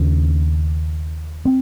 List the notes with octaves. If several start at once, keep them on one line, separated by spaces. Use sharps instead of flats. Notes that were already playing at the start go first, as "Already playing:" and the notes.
Already playing: D#2 C#3 C#4
C4